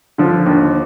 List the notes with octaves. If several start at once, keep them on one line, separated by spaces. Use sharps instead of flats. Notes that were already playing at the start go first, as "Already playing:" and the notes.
D3 F3
D#2